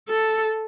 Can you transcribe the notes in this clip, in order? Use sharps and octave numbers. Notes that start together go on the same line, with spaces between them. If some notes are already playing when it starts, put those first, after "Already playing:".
A4